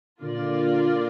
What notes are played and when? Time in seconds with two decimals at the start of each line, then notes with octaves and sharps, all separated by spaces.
0.21 A#2 D3 A#3 F4 A#4 D5